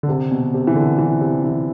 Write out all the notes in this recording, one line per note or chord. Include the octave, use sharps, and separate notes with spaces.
D3
C3
B2
C3
E3
D3
E3
C3
E3